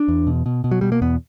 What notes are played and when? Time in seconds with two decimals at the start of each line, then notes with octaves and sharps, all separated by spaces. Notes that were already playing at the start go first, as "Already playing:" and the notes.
Already playing: D4
0.08 E2
0.27 B2
0.46 B2
0.64 B2
0.71 F#3
0.81 B2 G3
0.92 A#3
1.01 E2 B3